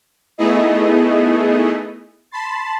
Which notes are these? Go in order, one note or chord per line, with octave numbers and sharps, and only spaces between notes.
A3 B3 D#4 E4 G#4 D#5
A5 B5 C6 A6